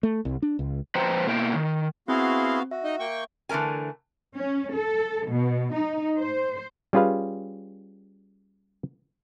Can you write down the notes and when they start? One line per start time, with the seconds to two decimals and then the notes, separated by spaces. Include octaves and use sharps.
0.03 A3
0.25 C2
0.42 D4
0.59 C#2
0.95 F3 B4 C5 G5 A#5
1.27 B2 A#3 E4 A4 G5
1.55 D#3
2.08 B3 C4 E4 F#4 G#4 F5 C6
2.71 F#4 E5
2.84 D#4 D#5
3.00 A#3 G5 C#6
3.49 D3 E3 A3 A#4 G#5
4.35 C#4
4.74 A4
5.28 B2
5.73 D#4
6.19 C5
6.93 G3 C#4 F4 G#4 B4 F5